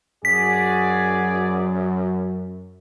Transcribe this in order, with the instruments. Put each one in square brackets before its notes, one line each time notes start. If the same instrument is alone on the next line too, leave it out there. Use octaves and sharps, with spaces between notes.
[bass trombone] F#2 [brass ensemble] F#4 G#4 D5 [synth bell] B6